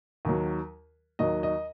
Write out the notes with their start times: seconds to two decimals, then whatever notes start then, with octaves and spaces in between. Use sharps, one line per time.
0.25 D#2 D#3 F#3
1.19 D#2 D#3 F#3 D#5
1.43 D#5